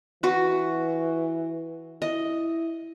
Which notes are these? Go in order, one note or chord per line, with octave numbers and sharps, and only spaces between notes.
E3 F#4 B4
E4 D#5